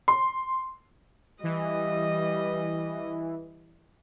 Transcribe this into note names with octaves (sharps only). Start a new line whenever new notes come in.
C6
E3 G3 D#5